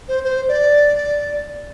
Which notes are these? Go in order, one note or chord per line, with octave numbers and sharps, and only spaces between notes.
C5
C5
D5